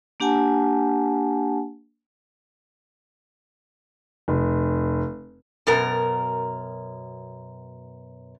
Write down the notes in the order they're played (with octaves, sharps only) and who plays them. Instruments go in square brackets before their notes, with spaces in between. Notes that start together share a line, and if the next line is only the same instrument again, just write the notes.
[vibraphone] A#3 D4 G4 F#5 G#5 A5
[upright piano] F1
[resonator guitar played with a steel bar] F#2 B2 A#4